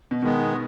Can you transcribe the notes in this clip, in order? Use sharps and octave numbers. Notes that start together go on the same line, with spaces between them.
B2
B2 D#3 G#3 B3